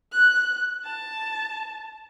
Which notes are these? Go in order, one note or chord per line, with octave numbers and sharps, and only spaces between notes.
F#6
A5